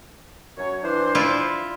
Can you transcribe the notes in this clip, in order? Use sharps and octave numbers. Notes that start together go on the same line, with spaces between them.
F#2 C#5
E3 D4 C5
E4 F4 D5